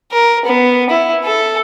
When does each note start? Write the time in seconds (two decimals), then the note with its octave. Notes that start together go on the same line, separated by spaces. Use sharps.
0.12 A#4
0.45 B3
0.90 E4
1.25 A4